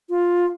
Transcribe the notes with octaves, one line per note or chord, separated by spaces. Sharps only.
F4